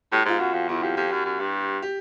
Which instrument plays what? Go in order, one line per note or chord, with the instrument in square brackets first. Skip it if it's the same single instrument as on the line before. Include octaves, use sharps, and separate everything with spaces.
[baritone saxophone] A2 [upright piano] G4
[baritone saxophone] G#2 [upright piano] F4
[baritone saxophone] F#2 [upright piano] F#4
[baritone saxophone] F2
[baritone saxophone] E2 [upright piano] E4
[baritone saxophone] F2 [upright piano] G4
[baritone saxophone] F2 [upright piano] G4
[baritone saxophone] F#2
F#2
G2
[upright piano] G4